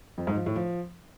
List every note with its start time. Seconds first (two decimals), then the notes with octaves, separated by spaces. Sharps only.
0.18 F2
0.27 G#2
0.37 F3
0.46 A2
0.56 F3